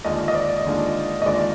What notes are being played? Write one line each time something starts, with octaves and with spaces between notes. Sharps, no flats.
D#2 D3 G#3 D4 F4 D#5
D#5
D5
D#2 D3 G#3 D4 F4
D#5
D#2 D3 G#3 D4 F4 D5